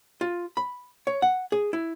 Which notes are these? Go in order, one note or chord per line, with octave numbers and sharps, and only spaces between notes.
F4
B5
C#5
F#5
G#4
E4